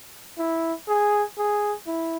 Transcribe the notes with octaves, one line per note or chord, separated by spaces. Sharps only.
E4
G#4
G#4
E4